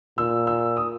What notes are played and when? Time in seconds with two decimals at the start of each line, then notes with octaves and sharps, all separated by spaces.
0.18 A#2 E6
0.47 E6
0.77 D#6